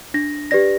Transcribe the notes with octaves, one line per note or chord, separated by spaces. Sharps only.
D4 A#6
G4 B4 D5 A#6